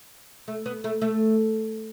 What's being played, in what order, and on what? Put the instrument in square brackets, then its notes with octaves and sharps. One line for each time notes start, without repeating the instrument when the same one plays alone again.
[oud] A3
B3
A3
A3